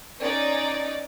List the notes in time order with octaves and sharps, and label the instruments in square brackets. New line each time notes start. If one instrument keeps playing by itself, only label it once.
[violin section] C#4 D#4 C#5 D5